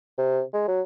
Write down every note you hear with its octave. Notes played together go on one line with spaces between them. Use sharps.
C3
G#3
F#3